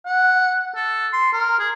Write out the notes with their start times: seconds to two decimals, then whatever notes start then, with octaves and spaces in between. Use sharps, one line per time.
0.06 F#5
0.75 A4
1.13 C6
1.33 A#4
1.59 G#4